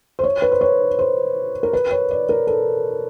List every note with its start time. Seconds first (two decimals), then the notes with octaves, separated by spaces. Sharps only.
0.19 C5
0.24 C#5
0.42 B4
0.52 C5
0.61 C#5
0.99 C5
1.63 A#4
1.73 B4
1.91 C#5
2.11 D5
2.29 A#4
2.47 A4